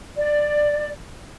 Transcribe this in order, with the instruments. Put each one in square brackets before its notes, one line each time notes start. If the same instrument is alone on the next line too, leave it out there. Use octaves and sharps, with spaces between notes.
[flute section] D5